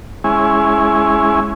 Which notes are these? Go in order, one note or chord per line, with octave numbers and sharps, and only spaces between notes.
G#3 C#4 E4 G#5